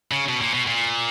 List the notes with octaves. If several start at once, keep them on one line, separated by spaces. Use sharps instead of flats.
C#3
B2
A#2
B2
A#2